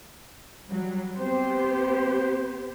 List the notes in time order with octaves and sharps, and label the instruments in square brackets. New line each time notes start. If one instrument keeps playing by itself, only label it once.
[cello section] F#3 G3
[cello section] B3 G4 C5 [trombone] C4